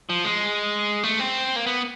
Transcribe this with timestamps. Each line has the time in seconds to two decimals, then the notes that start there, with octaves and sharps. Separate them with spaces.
0.09 F3
0.25 G#3
1.03 A3
1.20 C4
1.56 A#3
1.66 B3